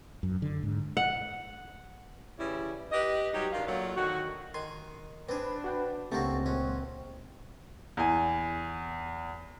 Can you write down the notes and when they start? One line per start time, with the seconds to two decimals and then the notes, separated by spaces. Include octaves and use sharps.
0.23 F#2
0.42 D3
0.63 G#2
0.97 F#5
2.39 C#3 E3 G3 E4
2.91 G4 B4 D#5
3.33 F#3 G3 D#4 G4
3.53 D#3 D4 F4
3.66 A#2 F#3 A3 F4
3.96 D3 D#3 F#4
4.54 D#3 G#5 C6
5.29 C4 D4 G#4 B4
5.64 F#4 F#5 G5
6.12 C#2 A3 A#3 C4 F#4 G4 A4 E5
6.46 A#2 G#3 C#4 F#5
7.97 E2 G#5